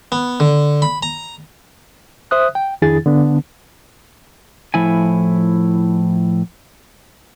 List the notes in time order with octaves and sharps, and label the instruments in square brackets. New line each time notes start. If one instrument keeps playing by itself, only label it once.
[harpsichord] B3
D3
B5
A#5
[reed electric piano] C5 E5 D#6 F#6
G5
F2 D#3 D4 E4 G#4 A6
D3 B3 D4
[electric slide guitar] A2 F3 E4 G#5